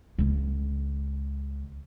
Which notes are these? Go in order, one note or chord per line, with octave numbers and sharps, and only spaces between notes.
C#2 C#3